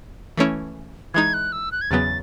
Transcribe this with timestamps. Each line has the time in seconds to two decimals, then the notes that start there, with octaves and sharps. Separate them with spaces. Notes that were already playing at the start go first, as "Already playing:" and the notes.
0.37 E3 A3 C#4 E4
1.14 E3 G#3 D#4 G#6
1.34 F#6
1.52 E6
1.72 F#6
1.81 G#6
1.91 E2 C#3 F#3 B3 A6